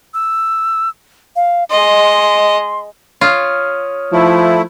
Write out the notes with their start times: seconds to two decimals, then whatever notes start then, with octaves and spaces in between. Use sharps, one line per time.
0.14 E6
1.36 F5
1.70 G#3 D#5 C6
3.21 F4 C#5 D#6 F6
4.13 F3 A3 E4